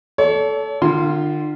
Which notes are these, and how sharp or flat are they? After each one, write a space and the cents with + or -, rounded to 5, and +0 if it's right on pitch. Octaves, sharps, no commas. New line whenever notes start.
A4 -10 C#5 +45
D3 +45 F4 +0 C6 +0